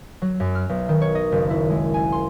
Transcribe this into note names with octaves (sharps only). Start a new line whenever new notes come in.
F#3
F#2
F6
B1
D#3
C#5
D#5
F#1
E4
G#3
G#5
C6